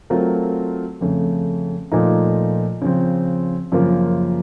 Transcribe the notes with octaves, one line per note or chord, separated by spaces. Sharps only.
F#3 A3 C4 F4 A#4
F2 C#3 A3
A#2 F3 A3 D#4
C#3 F3 C4
F#2 C#3 F3 A#3 F4